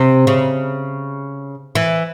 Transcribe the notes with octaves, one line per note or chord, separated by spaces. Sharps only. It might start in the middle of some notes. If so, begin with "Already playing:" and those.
Already playing: C3
C#3
E3